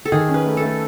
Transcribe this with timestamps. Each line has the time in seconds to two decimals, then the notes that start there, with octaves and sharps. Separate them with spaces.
0.05 A4
0.12 D#3 G#4
0.29 C#4
0.34 B4
0.46 A3
0.57 A4
0.63 A3